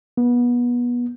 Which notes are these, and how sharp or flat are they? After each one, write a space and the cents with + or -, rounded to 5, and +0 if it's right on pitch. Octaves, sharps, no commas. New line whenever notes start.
B3 -25